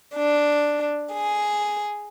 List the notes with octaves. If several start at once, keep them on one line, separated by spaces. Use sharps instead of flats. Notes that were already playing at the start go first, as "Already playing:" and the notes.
D4
G#4